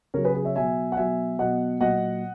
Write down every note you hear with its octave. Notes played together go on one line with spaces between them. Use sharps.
C#3 F#3 A#4 C#5
G#4 B4
G#4
C#5 E5
B2 F#3 E5 G#5
F#5
B2 F#3 E5 G#5
B2 F#3 D#5 F#5
A#2 F#3 D#5 F#5